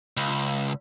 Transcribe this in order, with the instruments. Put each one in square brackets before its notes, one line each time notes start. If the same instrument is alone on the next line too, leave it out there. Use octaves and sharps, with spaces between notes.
[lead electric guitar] C#2